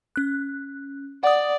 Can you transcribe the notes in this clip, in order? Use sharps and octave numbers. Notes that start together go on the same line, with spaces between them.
C#4 F#6
D5 F#5 D#6